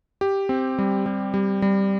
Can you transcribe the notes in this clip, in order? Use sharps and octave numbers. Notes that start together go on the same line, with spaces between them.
G4
C4
G3
G3
G3
G3